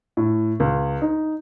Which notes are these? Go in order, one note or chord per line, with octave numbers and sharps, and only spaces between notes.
A2
C#2
D#4